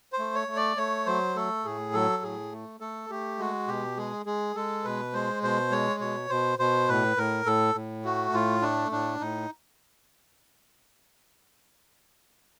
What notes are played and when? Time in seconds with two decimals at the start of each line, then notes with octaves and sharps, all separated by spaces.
0.13 C5
0.19 A3
0.34 C#5
0.48 A3
0.56 D5
0.77 A3 C#5
1.06 F#3 C5
1.35 A3 A4
1.65 A2 G#4
1.93 F#3 A4
2.23 A2 G#4
2.52 A3
2.80 A3 A4
3.10 A3 G4
3.39 G#3 F#4
3.68 B2 G4
3.97 G#3 G#4
4.26 G#3 G#4
4.55 G#3 A4
4.84 B2 B4
5.13 G#3 C5
5.43 B2 C5
5.71 G#3 C#5
6.00 B2 C#5
6.29 B2 C5
6.59 B2 C5
6.89 A2 B4
7.17 A2 A#4
7.45 A2 A4
7.75 A2
8.04 A3 F#4
8.33 A2 F4
8.62 A3 D4
8.91 A2 D4
9.20 A2 D#4